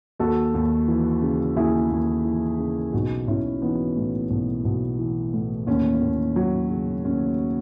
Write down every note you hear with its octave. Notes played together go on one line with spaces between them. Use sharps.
D#2 F#4 A4
D#2
E3
C#3
D#2 E4 G#4
D#2
E3
C#3
B1 D#4 F#4
B1 C#4 E4
E3 B3 D#4
A2
B1
B1
E3
A2
D#2 C#4
D#2
F#3
C#3
D#2 C#4